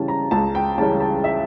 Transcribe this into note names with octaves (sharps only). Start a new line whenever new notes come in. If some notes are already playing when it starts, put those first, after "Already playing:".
Already playing: C#3 E3 G3 C#4 G5 A5
A#5
C#2 A5
G5
C#3 E3 G3 C#4 A5
A5
E5